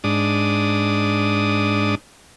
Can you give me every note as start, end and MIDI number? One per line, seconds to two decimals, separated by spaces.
0.04 1.95 44
0.04 1.95 62
0.04 1.95 87